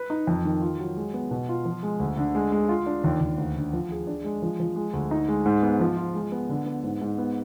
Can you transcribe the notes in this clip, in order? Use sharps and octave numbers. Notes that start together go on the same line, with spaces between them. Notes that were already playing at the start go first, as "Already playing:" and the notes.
Already playing: B4
D#4
F2
D#3
F4
F#3
G#3
B3
B2
F4
F3
G#3
D2
D3
G#3
G#3
F4
D4
D#2
D#2
D2
D3
F3
G#4
D4
G#3
F3
F3
G#3
D2
D#4
G#3
G#2
B3
F3
F4
G#3
B3
D3
B3
G#2
G#2
B3